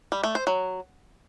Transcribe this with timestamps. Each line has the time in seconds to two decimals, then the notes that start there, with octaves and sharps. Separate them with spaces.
0.12 G3
0.24 A3
0.35 C5
0.47 F#3